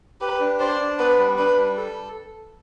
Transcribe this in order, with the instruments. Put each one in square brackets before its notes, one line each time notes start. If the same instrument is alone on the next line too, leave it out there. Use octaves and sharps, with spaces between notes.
[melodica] G4 [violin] B4
[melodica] D4
[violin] C5 [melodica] D5
[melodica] D4
[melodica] B3 [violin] B4
[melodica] G3
[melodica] D4 [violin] B4
[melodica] G3
A4